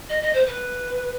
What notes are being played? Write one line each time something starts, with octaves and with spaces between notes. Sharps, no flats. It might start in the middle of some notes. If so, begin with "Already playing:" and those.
D#5
D#5
C5
B4